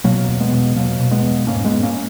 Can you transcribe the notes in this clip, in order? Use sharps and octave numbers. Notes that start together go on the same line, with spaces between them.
B2 F#3 A#3
E2
G#3 B3
B2
B2 F#3 A#3
B2
G#3 B3
E2
G#2 A#3 C#4
G#3 B3
G#2
A#3 C#4